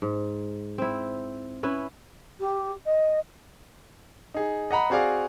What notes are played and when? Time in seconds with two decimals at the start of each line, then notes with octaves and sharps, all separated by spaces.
0.02 G#2
0.78 C4 E4
1.63 C#4 E4 B4
2.40 G4
2.85 D#5
4.34 D#4 G#4
4.71 D#5 F#5 A#5 B5
4.90 C4 F#4 G#4 D5 F5